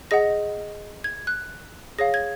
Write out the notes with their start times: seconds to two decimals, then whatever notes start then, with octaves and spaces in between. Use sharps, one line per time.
0.11 G#4 D#5 F#5 A#6
1.04 G#6
1.27 F#6
1.99 G#4 C#5 F5 A#6
2.14 G#6